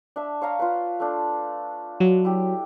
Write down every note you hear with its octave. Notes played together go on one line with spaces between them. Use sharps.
D4 E5
C#5 F5 A#5
F4 B4
A3 D4
F#3
E4 G4